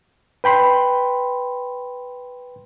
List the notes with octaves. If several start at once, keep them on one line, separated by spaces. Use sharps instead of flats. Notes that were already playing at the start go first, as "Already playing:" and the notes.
B4 G5 B5 C6